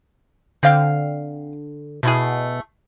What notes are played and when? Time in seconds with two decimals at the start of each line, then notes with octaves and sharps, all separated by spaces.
0.63 D3 C4 F5 G5
2.03 B2 A3 E4 G#4